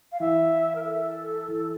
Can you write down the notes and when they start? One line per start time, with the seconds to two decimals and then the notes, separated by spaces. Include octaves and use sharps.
0.12 F5
0.20 E3 E5
0.75 A#4
0.84 A4
1.48 E3